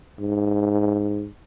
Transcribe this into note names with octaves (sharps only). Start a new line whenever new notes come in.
G#2